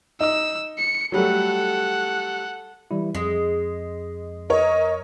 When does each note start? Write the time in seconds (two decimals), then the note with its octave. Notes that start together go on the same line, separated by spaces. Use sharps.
0.21 D#4 E6
0.78 C#7
1.12 F#3 G3 A3 A4 F#5
2.91 E3 G3 E4
3.15 F2 G#3
4.50 A#4 C#5 D#5